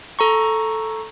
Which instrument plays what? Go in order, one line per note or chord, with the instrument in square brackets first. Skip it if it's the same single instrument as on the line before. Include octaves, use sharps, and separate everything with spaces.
[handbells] A4 A#5 C#6